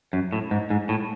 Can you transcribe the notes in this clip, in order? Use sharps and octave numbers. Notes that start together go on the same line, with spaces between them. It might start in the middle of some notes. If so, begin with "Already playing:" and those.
F#2
A2
G#2
G#2
A2